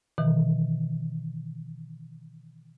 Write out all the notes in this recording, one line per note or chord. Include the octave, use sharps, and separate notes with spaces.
B2 D#3 E3